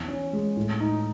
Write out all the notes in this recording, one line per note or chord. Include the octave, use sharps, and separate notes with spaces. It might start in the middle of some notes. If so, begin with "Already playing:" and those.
Already playing: E2
C#4
G#3
A2
D#4